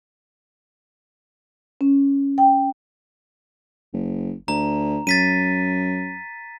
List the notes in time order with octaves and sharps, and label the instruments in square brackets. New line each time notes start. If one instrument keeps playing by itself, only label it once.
[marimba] C#4
G5
[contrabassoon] F#1
[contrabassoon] D2 [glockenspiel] A#5
[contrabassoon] F#2 [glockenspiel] A6 B6 D#7